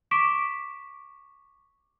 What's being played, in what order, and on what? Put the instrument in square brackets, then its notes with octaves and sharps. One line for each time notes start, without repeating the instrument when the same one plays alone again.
[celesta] C#6 D6 B6 D7 E7